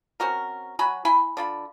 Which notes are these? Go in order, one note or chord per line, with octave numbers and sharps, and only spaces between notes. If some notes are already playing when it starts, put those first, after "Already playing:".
C4 C#4 F#4 A#4
F#3 F#4 G#5 B5
E4 G#5 B5 C6
D3 F4 B5